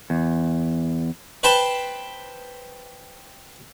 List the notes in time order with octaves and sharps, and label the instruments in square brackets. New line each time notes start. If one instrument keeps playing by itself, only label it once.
[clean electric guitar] E2
[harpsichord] B4 C5 G5 A5 B5 C6